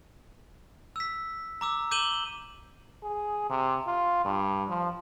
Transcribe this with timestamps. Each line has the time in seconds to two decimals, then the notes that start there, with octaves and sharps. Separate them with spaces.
0.96 E6 B6
1.61 A#5 D6 E6
1.91 D6 G6 D#7 E7 F#7 G7
3.03 G#4
3.49 C3
3.87 F4
4.25 G2
4.69 F3